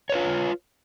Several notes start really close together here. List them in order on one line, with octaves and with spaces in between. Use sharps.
C#5 B4 F4